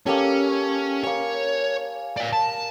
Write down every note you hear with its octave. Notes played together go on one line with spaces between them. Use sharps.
A#3 C#4 G4 A4
A#3 C#5 G#5
D5 F5
A5